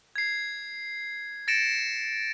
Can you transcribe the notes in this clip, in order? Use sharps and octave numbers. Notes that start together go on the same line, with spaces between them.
G#6 C7
A6 A#6 C#7 D7 E7